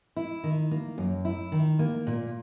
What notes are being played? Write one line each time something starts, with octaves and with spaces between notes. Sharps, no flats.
E4
D#3
A#3
F#2
E4
D#3
A#3
A#2